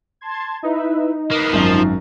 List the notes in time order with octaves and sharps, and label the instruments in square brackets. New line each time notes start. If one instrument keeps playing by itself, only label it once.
[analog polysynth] A5 C6 G#6
[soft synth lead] D#4 [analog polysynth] E4 B4 E5
[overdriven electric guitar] A#3 B3 [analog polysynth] A#4 D#6 C7
[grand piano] G#1 F#2 [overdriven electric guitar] F3